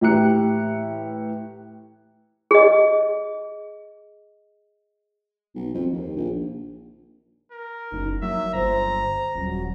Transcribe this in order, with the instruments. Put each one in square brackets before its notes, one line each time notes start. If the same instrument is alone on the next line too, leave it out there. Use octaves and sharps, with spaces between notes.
[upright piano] A2 E3 G4 A#5 F#6 C#7
[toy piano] G#4 D#5
[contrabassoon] B1
F2
D#2
A#1
[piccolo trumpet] A#4
[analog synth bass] F#1 [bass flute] D#4
[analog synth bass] F#3 [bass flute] A#3 [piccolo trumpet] E5
[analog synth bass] G1 [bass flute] C5 [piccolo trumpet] A#5
[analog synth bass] D#1 [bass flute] F#3